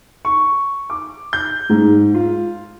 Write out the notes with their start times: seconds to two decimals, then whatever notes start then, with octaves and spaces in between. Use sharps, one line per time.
0.25 C#6
0.90 D6
1.33 G6
1.70 G#2
2.14 F4